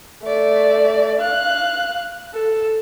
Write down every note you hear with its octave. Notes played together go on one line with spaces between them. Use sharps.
A3 D5
F5 F#6
A4